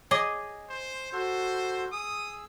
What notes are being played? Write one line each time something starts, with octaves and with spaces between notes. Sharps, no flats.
G#4 C#5 D#5 D6
C5
F#4 A4 C5
G#4 D#6 E6